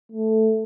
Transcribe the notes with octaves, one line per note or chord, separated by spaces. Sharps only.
A3